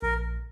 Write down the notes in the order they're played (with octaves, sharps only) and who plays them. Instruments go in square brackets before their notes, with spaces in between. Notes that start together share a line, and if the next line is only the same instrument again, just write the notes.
[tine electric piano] A#1 [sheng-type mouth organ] A#4